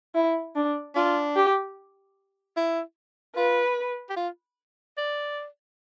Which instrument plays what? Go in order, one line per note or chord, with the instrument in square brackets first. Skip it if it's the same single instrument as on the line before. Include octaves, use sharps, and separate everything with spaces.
[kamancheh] E4
D4
[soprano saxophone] D4 [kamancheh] F4
[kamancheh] G4
[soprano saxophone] E4
[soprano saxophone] F4 [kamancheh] B4
[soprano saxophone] G4
F4
D5